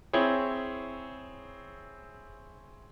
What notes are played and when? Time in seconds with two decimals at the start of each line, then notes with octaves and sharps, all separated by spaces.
0.13 C4 E4 G#4 C#5